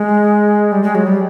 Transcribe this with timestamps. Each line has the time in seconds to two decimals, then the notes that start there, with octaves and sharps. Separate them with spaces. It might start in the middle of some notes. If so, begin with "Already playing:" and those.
Already playing: G#3
0.72 G3
0.83 G#3
0.95 F#3
1.07 G3